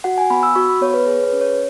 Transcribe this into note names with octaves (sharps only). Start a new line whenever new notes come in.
F#4 F#5
G#5
B3 B5
E6
F#4 C#6
B5
B3 C#5
B4
G#4 C#5
B4
C#4
C#5